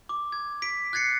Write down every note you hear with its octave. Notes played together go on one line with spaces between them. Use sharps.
D6
G#6
B6 D7
F#6 G#6 A6 C7 C#7